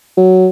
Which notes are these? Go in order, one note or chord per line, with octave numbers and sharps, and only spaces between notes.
F#3